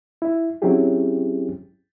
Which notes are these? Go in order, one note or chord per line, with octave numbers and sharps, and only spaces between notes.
E4
F#3 C4 C#4 E4 G4 G#4